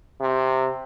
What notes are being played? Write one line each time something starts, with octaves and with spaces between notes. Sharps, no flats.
C3